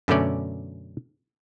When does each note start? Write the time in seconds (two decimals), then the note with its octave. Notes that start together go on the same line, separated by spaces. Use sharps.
0.08 F#2 B2 D3 A3 C#4 D5